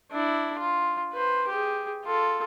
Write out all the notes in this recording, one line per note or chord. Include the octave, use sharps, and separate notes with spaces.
D4 E4
F4
B4 C5
G4 G#4
F4 A4